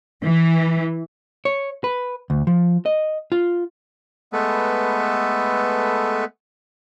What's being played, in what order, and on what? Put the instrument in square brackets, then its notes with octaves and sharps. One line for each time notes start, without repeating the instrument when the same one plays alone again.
[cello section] E3
[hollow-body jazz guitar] C#5
B4
D2
F3
D#5
F4
[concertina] G#3 A3 B3 A4 B4